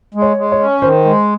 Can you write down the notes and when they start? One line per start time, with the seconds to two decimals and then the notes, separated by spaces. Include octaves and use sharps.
0.15 G#3
0.22 C#5
0.37 G#3
0.52 C#5
0.59 C#4
0.82 D#3 C5
1.05 G#3